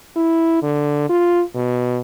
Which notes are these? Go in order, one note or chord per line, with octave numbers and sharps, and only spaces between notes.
E4
D3
F4
B2